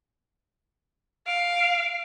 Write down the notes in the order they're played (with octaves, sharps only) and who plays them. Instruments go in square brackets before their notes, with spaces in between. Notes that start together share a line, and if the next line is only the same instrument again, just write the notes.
[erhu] F5 [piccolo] D7